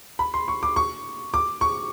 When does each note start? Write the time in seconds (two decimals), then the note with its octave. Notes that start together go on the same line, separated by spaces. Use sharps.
0.19 B5
0.34 C6
0.48 C#6
0.63 D6
0.76 C#6
1.34 D6
1.61 C#6